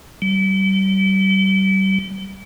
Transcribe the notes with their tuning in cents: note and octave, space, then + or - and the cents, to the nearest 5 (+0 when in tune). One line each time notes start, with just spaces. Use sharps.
G3 -35